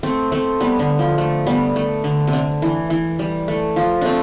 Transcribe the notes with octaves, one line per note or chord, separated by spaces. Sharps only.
A3 C4
A3 C4
G3 B3
D3
F3
A3
G3 B3
A3
D3
C3
D3
E3
E3
G3
A3
F3
A3 C4 D4